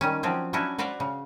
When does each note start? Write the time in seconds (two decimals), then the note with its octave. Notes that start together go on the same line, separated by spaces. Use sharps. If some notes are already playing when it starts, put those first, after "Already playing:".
0.01 D#3 G3 C#4
0.23 F3 F#3 C4 C#4
0.53 F#3 C#4 D4 E4 F#4
0.78 F#4 B4 C5 D5 F5
1.00 C#3